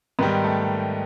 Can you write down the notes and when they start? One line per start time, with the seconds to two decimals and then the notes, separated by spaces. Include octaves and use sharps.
0.19 G#2 D#3 G3 B3
0.44 A3